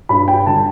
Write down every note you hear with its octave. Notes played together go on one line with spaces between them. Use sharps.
G2 B5
G5
D3 G3 A5